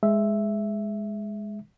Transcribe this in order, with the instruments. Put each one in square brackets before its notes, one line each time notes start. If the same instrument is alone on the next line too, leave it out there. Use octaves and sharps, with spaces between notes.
[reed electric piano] G#3 E5